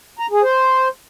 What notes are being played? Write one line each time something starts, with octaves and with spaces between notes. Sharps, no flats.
A#5
G#4
C5